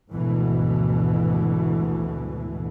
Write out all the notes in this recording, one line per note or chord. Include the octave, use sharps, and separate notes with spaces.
G#1 D2 B2 E3